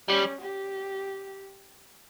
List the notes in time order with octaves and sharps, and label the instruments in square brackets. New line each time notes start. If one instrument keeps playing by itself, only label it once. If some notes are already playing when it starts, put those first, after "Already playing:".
[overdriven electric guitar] G3 [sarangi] C#4
[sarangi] G4